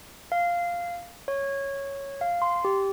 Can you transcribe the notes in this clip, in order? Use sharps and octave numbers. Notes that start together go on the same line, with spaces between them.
F5
C#5
F5
C6
G4